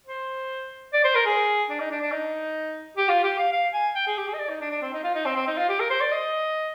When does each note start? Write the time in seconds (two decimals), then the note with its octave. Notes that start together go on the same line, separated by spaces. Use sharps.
0.07 C5
0.93 D5
1.04 C5
1.15 A#4
1.26 G#4
1.70 D4
1.80 D#4
1.91 D4
2.01 D4
2.12 D#4
2.97 G4
3.09 F4
3.24 G4
3.39 F5
3.52 F5
3.74 G#5
3.95 G5
4.07 G#4
4.18 G4
4.28 G#4
4.34 D#5
4.39 D5
4.49 D#4
4.61 D4
4.71 D4
4.82 C4
4.93 D#4
5.04 F4
5.15 D#4
5.25 C4
5.36 C4
5.47 D#4
5.58 F4
5.69 G4
5.80 A#4
5.90 C5
6.01 D5
6.12 D#5